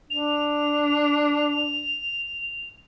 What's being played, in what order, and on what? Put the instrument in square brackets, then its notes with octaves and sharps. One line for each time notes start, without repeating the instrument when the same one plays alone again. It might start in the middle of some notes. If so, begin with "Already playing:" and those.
[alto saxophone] D4 [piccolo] F7